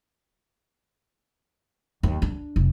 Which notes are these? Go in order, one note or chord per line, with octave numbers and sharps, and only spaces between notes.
D#2
D4
F1